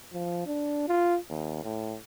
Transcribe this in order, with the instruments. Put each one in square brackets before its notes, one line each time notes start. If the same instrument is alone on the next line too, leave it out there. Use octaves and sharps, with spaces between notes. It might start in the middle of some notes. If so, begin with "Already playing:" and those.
[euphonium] F3
D4
F4
D#2
A2